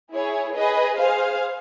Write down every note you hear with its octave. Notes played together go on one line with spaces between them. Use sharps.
E4 G#4 C#5
G#4 B4 D#5
G#4 C5 F5